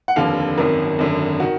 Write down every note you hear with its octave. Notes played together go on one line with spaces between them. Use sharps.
F#5
F1 D#2 D3 F5
G#1 F#2 D#3 A#4
G#1 F#2 D3
D#3 F#4